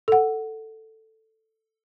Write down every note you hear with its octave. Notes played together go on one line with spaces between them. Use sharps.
A4 F#5